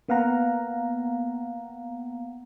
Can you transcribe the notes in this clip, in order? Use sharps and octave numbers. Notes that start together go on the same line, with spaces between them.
A#3 B3 F5 F#5 A#5